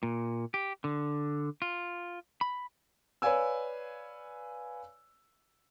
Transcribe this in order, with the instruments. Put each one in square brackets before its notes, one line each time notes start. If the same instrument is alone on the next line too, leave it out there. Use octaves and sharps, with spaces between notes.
[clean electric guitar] A#2
G4
D3
F4
B5
[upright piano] B4 C#5 D5 F5 G#5 E6